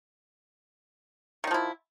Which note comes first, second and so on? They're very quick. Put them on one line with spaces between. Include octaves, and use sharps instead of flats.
D#3 D#4 F3 E4